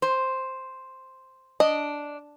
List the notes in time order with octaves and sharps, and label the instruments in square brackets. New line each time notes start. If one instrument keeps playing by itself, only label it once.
[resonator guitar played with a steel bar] C5
[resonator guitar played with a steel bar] D4 [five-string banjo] D#5